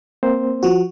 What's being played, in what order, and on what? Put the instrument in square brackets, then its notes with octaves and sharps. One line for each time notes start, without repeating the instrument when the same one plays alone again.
[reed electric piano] A#3 C4 C5
[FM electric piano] F3 F#4